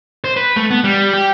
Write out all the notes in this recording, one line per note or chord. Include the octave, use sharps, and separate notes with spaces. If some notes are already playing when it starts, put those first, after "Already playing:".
C5
B4
A3
B3
G3
G4